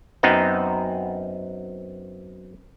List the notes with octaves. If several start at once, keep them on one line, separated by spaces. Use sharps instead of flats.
F#2 B3 C4 D#4